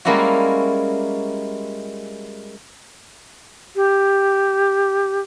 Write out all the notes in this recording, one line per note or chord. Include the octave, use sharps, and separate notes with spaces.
G3 G#3 A#3 C#4 E4 F#4
G4